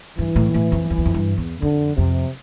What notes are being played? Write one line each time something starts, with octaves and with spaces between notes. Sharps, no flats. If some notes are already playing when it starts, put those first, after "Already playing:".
G2 E3
A2
A2
F2
F2
E2
F2
G2
E2
F2 D3
F2 C3